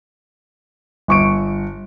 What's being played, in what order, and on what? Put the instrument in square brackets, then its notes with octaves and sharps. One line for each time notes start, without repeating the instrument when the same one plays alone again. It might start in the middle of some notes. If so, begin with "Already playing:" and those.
[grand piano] G1 C#6 D7